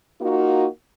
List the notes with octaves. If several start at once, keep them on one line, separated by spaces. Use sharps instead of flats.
A#3 D#4 F4 F#4